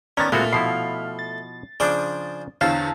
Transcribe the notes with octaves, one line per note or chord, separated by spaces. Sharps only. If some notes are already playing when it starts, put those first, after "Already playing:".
D#3 B3 C#4 D4 A#5 A6
A#2 G#3 A3 C4 F#4 F5 B5 F6
B2 F3 E4 C7
A6
C#3 F3 D4 G#4 C5 D5
E2 D3 C5 C#5 F5 A5 E6